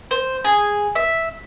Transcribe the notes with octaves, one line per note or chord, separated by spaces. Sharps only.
C5
G#4
E5